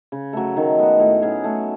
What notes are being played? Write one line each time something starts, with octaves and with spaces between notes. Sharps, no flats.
C#3
F#3 A3
D#3
G#3 B3 F#4
A2
F#3 C#4 G#4
A3